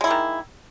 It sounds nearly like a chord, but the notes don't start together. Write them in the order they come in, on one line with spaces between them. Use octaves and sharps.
G#3 E4 A#3 D#3